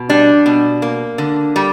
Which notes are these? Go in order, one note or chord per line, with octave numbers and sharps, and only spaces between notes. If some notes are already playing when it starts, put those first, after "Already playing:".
Already playing: B2
G3 D4
B2
A#3
D3
G3